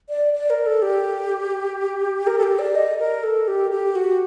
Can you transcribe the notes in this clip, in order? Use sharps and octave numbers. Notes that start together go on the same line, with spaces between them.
D5
D5
A#4
A4
G4
A#4
A4
G4
D5
D#5
A#4
A4
G4
G4
F#4